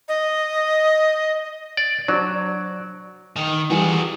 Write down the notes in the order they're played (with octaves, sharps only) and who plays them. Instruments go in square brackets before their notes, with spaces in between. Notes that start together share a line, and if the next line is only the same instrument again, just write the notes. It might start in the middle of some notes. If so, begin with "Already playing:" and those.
[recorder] D#5
[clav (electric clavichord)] D5
[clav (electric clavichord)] F#3 [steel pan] D4 C5 D5
[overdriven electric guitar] D#3
[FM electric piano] E3 G3 [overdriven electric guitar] F#4 G#4